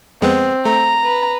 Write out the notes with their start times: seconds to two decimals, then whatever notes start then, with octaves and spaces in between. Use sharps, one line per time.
0.22 F2 G#3 B3 C4
0.65 A3 A#5
1.04 B4